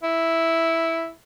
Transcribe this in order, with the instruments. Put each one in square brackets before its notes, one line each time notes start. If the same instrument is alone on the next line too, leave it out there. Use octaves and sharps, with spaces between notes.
[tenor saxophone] E4